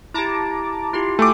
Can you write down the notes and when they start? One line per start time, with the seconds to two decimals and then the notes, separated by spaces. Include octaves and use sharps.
0.14 E4 G4 A5 A#5 D6
0.93 E4 F4 G4 C6
1.19 A3 G5 G#5 D6